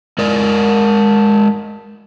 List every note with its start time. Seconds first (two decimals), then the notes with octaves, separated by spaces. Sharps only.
0.18 G#3 A#4 D5